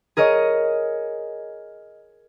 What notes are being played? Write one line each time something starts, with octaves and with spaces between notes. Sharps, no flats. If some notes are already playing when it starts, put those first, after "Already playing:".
G#4 A#4 C#5 D#5